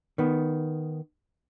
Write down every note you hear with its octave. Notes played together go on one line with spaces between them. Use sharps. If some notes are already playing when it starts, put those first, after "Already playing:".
D#3 B3